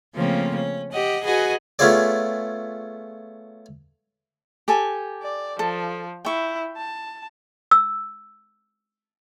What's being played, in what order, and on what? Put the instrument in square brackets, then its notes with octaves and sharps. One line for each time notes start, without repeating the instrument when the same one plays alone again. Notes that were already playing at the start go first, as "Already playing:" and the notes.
[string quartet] C#3 F3 A3 A#3 C4 C#4
C#4
G4 D#5 F#5
F#4 G#4 B4 D#5 F#5 G#5
[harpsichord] A3 B3 C#4 F4 G#4 D5
[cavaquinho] G4 A4 G#5
[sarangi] D5
[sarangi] F3 [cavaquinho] A4
[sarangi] E4 [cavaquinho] G5 C#6
[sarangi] A5
[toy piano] E6